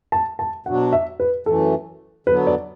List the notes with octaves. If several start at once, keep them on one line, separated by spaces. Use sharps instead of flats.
A5
A5
B2 F#3 D4 F#4 F#5
E5
B4
F#2 E3 A3 A4
D3 F#3 B3 B4
D5